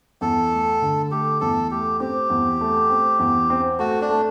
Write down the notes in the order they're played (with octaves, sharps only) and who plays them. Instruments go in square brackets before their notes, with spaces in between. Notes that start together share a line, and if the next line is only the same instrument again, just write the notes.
[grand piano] E2 [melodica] A4
[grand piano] A3
D3
[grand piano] A3 [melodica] G4
[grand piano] E2 [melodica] A4
[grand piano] A3 [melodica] G4
[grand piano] C4 [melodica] G4
[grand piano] E2
A3
C4
E2
C4
[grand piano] A3 [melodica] F#4
[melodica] D4
[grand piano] A3